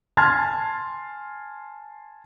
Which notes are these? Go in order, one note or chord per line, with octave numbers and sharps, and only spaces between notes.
G#5 A5 C6 F6 G#6 A6